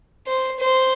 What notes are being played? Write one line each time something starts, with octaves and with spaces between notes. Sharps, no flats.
C5
C5